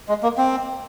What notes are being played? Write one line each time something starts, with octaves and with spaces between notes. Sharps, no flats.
G#3
A#3
C4